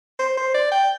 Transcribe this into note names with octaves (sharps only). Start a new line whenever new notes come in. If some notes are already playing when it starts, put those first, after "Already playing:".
C5
C5
D5
G5